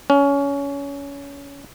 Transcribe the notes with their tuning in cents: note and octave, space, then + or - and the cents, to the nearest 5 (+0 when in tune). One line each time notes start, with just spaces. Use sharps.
C#4 +20